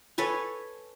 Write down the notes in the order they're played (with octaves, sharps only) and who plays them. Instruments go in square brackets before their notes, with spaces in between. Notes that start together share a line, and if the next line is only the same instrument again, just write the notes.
[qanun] A4 B4 C#5 G#5